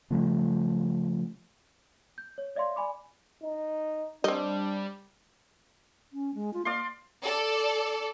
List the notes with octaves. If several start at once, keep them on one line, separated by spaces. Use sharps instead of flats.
C#3 F3 G3 A3
G6
C#5
C#5 D5 E5 F5 C6
D5 G#5 B5 D6
D#4
G3 C4 D4 D#5
C#4
G#3
F4
A#3 D5 F5 C6
A4 D5